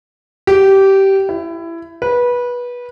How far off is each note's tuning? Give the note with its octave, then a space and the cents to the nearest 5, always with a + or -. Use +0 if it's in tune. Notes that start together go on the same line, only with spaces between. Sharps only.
G4 -15
E4 +20
B4 -20